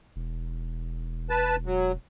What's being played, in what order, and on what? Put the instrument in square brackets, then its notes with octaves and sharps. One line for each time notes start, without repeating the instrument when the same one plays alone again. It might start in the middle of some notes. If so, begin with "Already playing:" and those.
[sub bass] E1
[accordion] B4 A5
F#3